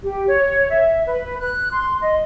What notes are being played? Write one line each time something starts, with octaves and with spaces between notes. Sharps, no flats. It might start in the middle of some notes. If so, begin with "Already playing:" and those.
G4
C#5
E5
B4
F#6
C6
D#5